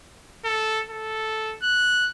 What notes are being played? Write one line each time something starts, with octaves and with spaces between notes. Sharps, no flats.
A4
A4
F#6